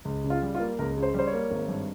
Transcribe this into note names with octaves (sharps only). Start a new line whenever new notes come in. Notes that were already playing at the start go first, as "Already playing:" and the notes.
C#2
C#3
F4
G3
F4
A#3
C#2 A#4
C#3
C5
G3 C5
C#5
A#3
G#1
G2